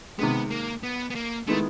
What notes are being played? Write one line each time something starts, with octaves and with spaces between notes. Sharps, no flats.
C3 D#3 G#3 B3
A#3
B3
B3
A#3
D#3 G#3 A3 B3 E4